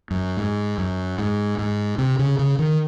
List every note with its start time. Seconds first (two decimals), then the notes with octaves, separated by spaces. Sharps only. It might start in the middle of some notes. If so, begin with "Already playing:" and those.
0.11 F#2
0.37 G#2
0.78 F#2
1.18 G#2
1.58 G#2
1.98 C3
2.19 C#3
2.39 C#3
2.59 D#3